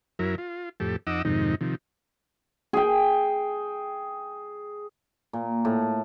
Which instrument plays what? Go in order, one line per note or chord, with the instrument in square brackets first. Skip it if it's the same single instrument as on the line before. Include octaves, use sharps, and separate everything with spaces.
[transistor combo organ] F#2 F#3 E4 A#4
F4
F2 A2 G4 A4
F2 D#4 D#5 F#5 D6 E6
F2 G#2 C3 D#3 D#4
C3 D#3 F3
[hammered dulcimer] G#4 G5
A#2
A2